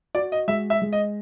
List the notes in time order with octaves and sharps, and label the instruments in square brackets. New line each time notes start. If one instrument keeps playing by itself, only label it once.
[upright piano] F#4 [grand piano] D5
[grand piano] D#5
[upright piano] G#3 [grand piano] E5
[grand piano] E5
[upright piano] G#3
[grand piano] D#5